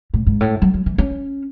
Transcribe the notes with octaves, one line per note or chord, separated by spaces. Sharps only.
A2
G#2
A2
F#3
F#3
E3
C#4